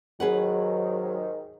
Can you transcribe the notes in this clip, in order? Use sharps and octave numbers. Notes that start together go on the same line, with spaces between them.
D#2 G#2 D#3 F#3 G#4 B4 F#5